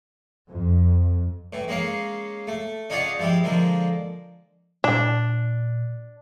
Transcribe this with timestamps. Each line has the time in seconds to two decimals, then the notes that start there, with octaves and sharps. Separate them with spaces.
0.51 F2
1.53 A2 E3
1.68 G#3 A#3 C#4 F5
2.47 A3
2.90 C#4 D#4 F4 G#4 D5 F#5
3.19 F3 G#3 E4 G4
3.44 D3 F3 G#3 A#3
4.84 A#2 D4